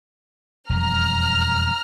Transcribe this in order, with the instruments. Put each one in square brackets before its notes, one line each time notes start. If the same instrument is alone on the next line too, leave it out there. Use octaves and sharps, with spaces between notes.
[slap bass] E1 F2 G3 [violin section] A#5 F6